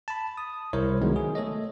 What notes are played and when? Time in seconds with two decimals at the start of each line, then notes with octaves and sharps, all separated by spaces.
0.08 A5 B5
0.37 D#6
0.73 C2 E4 A#4 C5 C#5
1.02 D#3 F#3 G#3 B3
1.16 G#4
1.35 A3 A4 C#5 D#5